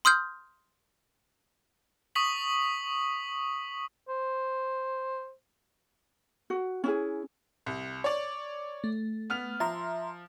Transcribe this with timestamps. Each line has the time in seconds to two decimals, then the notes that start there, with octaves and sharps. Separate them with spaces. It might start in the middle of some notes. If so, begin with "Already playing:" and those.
0.05 C6 D#6 F6 G6
2.15 C#6 D#6 B6 F#7
4.08 C5
6.50 F#4
6.84 C#4 E4 G#4
7.66 C2
8.04 C#5 D5
8.84 A3
9.30 B3 F6 F7
9.60 F3 E5 A#5 C6